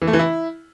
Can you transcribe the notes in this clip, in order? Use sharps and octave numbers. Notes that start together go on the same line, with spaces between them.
E3
A3
E3
E4